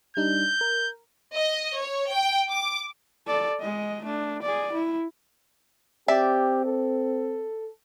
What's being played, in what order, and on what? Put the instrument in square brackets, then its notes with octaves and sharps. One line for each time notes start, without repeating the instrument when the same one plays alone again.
[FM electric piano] G3 D4 D#4 [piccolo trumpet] G6
[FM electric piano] A#4
[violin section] D#5
C#5
G5
D6
[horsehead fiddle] A4 D5
G#3 D#5
A3 D4
G#4 D5
E4
[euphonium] C4 [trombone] G4 [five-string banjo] D5 E5
[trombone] A4